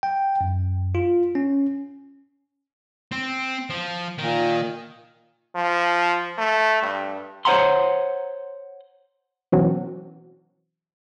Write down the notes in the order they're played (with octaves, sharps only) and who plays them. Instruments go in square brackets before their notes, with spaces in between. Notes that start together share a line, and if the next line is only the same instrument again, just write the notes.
[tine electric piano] G5
F#2
F4
C#4
[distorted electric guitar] C4
F3
[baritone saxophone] A#2 [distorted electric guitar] D#3
[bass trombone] F3
A3
G2
[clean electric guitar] C5 C#5 E5 F#5 A#5 C6
[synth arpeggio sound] B2 E3 F#3 C4 C#4 F#4